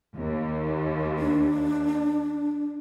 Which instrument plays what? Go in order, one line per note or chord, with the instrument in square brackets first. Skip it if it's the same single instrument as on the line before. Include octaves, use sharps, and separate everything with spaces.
[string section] D#2
[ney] D4